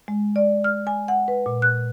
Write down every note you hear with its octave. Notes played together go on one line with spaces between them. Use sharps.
G#3
D5
F6
G#5
F#5
B4
A#2
F#6